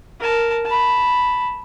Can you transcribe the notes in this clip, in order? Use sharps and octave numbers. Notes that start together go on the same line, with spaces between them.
A#4 A5
A5 B5